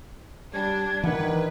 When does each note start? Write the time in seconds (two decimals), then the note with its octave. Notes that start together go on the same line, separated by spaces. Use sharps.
0.53 G3 D4 G#6
1.04 D#3 E3 D4 B4 F#5